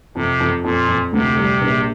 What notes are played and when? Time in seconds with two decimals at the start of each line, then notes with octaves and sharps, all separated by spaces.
0.15 F2 C3
0.40 F2
0.64 F2 A#2
0.88 F2
1.13 D2 C3
1.37 G3
1.61 A#1